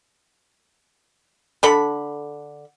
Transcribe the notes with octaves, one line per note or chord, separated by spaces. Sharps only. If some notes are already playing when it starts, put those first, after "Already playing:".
D3 A4 B5